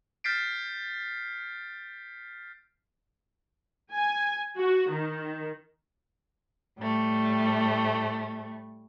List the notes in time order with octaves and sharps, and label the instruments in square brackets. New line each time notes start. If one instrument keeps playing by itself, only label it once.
[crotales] F6 G6 A6 B6 C7 D7
[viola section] G#5
F#4
D#3
[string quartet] A2 G3 A3